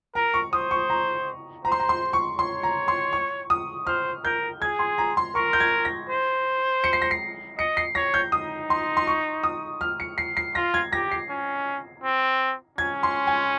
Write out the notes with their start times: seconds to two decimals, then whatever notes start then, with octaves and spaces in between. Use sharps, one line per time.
0.15 A#4 A#5
0.34 C#6
0.53 C5 D#6
0.71 C#6
0.90 A#5
1.65 C5 A#5
1.72 C6
1.80 A#5
1.89 C6
2.13 C#6
2.39 C#5 C6
2.63 A#5
2.88 C6
3.13 C#6
3.50 D#6
3.87 C5 F6
4.25 A#4 G6
4.62 G#4 G#6
4.79 C6
4.98 A#5
5.17 C6
5.35 A#4 C#6
5.53 G6
5.60 G#6
5.85 A#6
6.09 C5
6.84 C#7
6.93 C7
7.02 A#6
7.11 C7
7.58 D#5 C#7
7.77 C7
7.95 C#5 A#6
8.14 G6
8.32 D#4 D#6
8.70 C6
8.97 C6
9.07 C#6
9.44 D#6
9.81 F6
10.00 C#7
10.18 C7
10.37 C7
10.55 F4 A#6
10.74 G#6
10.93 G4 A#6
11.11 C7
11.29 C#4
12.04 C4
12.78 C#4 G#6
13.03 C6
13.27 G#5